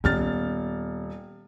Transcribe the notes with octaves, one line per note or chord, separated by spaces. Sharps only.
D#1 B3 C#4 F6 A6